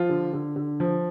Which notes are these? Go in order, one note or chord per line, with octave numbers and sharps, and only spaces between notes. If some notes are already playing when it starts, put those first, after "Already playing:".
Already playing: F3 F4
D3
D3
D3
F3